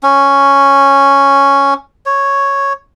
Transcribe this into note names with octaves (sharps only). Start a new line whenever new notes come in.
C#4
C#5